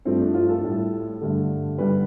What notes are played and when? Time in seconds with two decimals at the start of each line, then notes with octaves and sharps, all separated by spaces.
0.05 G2 F3 A3 C4
0.20 D4
0.34 F4
0.49 A4
0.63 A2 G3
1.21 G2 D3 A3
1.78 G2 D3 G3 B4